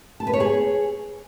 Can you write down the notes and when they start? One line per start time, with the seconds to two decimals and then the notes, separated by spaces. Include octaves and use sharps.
0.20 A5
0.27 B4
0.33 C#5
0.40 G#4